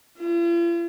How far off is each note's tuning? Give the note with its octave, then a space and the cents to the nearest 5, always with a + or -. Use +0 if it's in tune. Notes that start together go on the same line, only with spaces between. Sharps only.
F4 -45